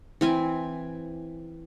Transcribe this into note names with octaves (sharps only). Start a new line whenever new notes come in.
E3 C4 G#5